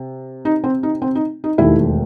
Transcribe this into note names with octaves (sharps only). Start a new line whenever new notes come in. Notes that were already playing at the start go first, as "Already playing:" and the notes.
Already playing: C3
D#4
C4
D#4
C4
D#4
D#4
E1 D#2 D#3 A3 E4